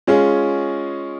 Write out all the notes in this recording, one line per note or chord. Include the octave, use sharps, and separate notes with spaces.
G#3 C#4 F4 G#4